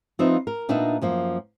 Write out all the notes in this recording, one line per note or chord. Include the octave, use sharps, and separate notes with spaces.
F3 C4 D#4 F4 B4 E5
A#4
A#2 B3 D4 D#4 A#4 E5
F#2 F3 A#3